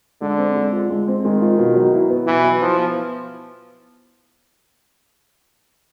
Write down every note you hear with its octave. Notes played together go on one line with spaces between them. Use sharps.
D3 G#3
C4
G#3
F4
G#3
C4
D#3 G#3
F4
B2
F#3
E4
B3
B2 E3
F#3
F3 E4
B3